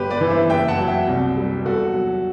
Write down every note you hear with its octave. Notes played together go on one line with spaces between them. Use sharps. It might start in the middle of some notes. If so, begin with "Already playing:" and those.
Already playing: G1 G4 B4
B4 D5
E3
C5 E5
F#1 E5 G5
F#5 A5
F#3
E5 G5
C2
G3
E2 F#4 A4
F#3